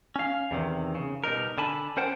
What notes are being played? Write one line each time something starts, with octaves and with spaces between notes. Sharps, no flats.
C#4 F5
E2 C3 D#3
C#3
B2 G3 D#4 A#4
D3 G#5 A5 B5
C#4 A#4 C5 F#5 G5 A5